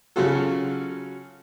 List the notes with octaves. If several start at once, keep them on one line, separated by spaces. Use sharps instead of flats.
C#3 F#3 C#4 F4 F#4 A4